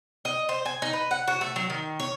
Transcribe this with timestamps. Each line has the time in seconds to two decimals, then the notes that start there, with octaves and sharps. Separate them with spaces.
0.25 D#5
0.49 C5
0.65 G#5
0.82 D#4
0.93 B4
1.11 F#5
1.28 F#4
1.41 A3
1.56 F#3
1.70 D#3
2.00 C#5